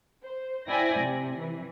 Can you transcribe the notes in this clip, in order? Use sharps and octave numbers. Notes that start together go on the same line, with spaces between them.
C5
E4 C5 D5 G5 G#5 A#6
C3
E3